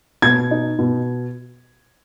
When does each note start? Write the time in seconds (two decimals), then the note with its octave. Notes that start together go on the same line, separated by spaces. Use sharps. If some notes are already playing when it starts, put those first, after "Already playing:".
0.22 B2 G#6
0.51 D#4
0.79 B2